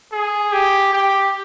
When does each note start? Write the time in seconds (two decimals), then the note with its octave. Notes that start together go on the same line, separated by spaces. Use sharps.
0.12 G#4
0.52 G4
0.93 G4